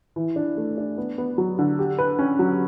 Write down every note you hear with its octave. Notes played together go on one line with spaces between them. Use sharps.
E3
D4
A3
D4
B3
B3
F#3
D3
G4
B4
C#4
F#3